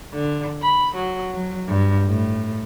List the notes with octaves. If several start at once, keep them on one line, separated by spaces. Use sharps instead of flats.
D3
B5
F#3
F#3
G2
A2